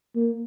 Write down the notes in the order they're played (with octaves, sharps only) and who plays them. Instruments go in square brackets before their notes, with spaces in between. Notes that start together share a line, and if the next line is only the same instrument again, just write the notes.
[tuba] A#3